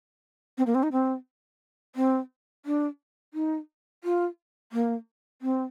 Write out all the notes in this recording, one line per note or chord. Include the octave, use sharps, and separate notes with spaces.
C4
A#3
C4
D#4
C4
C4
D4
D#4
F4
A#3
C4